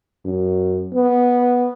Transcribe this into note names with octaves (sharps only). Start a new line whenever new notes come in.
F#2
B3